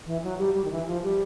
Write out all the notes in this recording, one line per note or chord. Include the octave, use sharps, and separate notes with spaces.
E3
F#3
G3
G3
D#3
E3
F3
G3